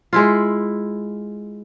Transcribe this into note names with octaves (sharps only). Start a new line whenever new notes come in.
G#3 E4 F4